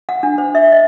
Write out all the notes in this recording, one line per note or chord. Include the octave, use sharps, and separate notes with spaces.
F#5
D4
C5
E5
D#5